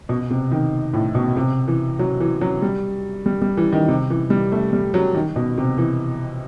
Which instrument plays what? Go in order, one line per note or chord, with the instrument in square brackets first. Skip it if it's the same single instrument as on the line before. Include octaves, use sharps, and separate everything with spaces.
[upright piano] B2
C3
D#3
A2
B2
C3
E3
F#3
E3
F#3
G3
G3
G3
E3
D#3
C3
E3
G3
A3
G3
F#3
D#3
B2
C3
E3